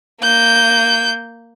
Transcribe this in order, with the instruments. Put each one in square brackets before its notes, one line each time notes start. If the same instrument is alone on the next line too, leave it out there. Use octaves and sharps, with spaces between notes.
[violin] A#3 G6